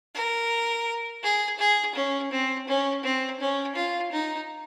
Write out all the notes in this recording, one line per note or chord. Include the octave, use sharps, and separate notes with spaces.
A#4
G#4
G#4
C#4
C4
C#4
C4
C#4
F4
D#4